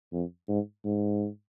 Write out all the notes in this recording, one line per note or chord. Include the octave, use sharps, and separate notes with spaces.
F2
G#2
G#2